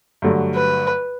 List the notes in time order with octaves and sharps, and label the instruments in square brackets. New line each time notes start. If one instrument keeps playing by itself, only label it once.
[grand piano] G2 D3 F#3 A3
[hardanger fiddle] B4